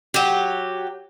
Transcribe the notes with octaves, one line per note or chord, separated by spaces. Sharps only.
F#3 G4